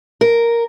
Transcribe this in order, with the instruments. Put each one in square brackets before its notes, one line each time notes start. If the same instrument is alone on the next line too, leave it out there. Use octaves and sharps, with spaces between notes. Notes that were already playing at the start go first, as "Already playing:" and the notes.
[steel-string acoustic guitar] A#4